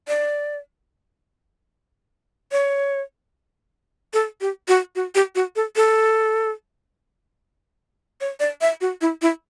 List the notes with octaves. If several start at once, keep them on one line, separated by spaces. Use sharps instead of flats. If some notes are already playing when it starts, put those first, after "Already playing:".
D5
C#5
A4
G4
F#4
F#4
G4
F#4
A4
A4
C#5
D5
E5
F#4
E4
E4